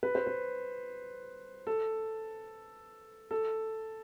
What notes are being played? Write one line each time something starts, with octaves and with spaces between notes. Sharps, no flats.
B4
C5
B4
A4
A4